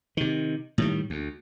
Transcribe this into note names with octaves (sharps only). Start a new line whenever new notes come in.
C3 D#3
A2 D#3 G3
D2